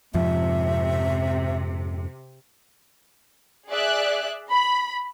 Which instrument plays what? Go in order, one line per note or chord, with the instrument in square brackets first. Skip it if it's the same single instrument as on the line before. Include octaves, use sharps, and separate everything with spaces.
[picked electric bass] F2 G#2 F3 [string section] C3 [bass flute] E5
[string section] G#4 D5 E5 F#6
B5